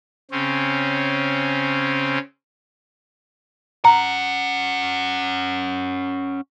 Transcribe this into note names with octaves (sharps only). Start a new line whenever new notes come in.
C#3 C4 C#4
C#4 F#5 A#5